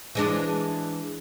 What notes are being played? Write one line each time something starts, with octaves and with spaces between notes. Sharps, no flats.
E3 G#3 D4